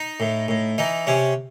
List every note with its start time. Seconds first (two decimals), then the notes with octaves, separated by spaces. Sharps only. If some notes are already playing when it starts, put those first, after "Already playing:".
Already playing: D#4
0.20 A2
0.48 A2
0.78 E3 D#4
1.07 C3 C#4